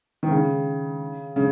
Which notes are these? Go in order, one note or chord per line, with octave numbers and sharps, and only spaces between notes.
D#3
C#3
C#3